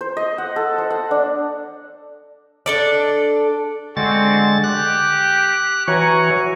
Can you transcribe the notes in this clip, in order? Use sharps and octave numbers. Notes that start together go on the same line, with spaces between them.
C5
D#5
F#5
A4
C5
F#5
D4
D4 A4 D5
D3 G#3 C4 F#4 A6
G4 F#6
E3 F#4 C#5 G#5 A#5 C#6